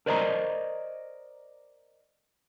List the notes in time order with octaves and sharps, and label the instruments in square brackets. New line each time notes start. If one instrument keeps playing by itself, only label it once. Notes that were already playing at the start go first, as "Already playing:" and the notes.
[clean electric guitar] A#4 C5 D5 D#5 G#5 A#5